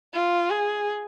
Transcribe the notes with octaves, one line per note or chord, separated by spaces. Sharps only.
F4
G#4